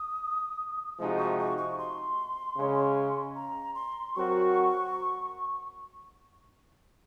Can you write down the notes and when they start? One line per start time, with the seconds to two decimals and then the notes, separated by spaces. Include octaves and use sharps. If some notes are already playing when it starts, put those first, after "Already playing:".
Already playing: D#6
0.99 C3 F3 G#3 D#4 F#4
1.18 C#6
1.39 C#6
1.58 C#6
1.78 C6
2.57 C#3 G#3 C#4
3.36 A#5
3.75 C6
4.14 F#3 C4 F#4 A#4 C#6